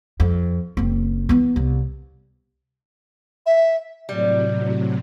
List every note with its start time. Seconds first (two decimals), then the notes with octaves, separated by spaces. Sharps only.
0.20 F2
0.77 F#1 C4
1.29 E3 B3
1.56 C2
3.46 E5
4.09 A2 C3 F#3 G3